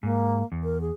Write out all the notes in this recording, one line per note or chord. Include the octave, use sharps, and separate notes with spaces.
G#2 A#3
E2
A#4
G#4